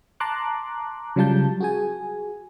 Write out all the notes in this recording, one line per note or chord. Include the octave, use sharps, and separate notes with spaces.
A5 A#5 C6 D6 F#6
C#3 F#3 G3 F4 A5 G6
F#4 G#4 G#5